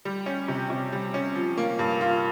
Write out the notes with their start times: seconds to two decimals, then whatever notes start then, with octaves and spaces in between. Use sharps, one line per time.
0.05 G3
0.26 C#4
0.48 C3
0.70 C3
0.92 G3
1.14 C#4
1.35 F3
1.57 A#3
1.79 G2
2.01 F4